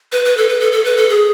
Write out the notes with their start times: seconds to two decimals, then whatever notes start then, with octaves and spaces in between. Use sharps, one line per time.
0.12 B4
0.25 B4
0.37 A4
0.49 B4
0.60 A4
0.72 A4
0.85 B4
0.97 A4
1.09 G#4